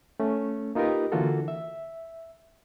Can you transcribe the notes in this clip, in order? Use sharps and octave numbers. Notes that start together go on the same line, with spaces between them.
A3 C#4
A#3 D#4 F4 G4 A#4 B4
D3 E3 A#3 F4 F#4 A4
E5